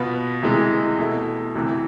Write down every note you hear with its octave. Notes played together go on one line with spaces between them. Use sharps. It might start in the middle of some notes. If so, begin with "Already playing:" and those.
Already playing: B2 B3 F4 B4
D2 C3 E3 G#3
B2 A3 E4
D2 C3 E3